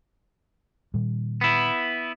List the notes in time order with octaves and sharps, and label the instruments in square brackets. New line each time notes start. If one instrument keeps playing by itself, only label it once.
[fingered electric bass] A#2 D#3 G3
[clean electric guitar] B3 E4